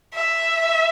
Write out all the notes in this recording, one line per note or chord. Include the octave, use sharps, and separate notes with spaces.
E5